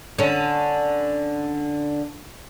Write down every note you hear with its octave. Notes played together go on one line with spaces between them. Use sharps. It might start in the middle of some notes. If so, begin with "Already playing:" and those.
D3 C#4